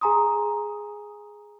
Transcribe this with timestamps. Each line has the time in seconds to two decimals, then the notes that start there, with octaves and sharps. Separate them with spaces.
0.01 G#4 G#5 A#5 C6 D#6